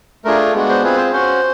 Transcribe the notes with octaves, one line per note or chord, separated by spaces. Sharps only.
A3 D4 F4 G#4 A#4
G#3 B3 D4 F#4
C5
C4 F4 G#4 B4
C5
C#4 F#4 C5